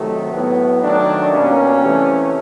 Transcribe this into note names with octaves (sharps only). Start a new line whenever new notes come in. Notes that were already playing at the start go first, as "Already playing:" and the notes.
Already playing: C3 D#3 F#3 A3
A2 F#3 B3
D#3 F#3 A3 D4
B2 G3 A#3 C#4
C3 E3 A3